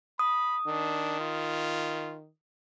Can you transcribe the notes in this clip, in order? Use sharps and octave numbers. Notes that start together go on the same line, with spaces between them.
B5 D#6
D#3 D4
F4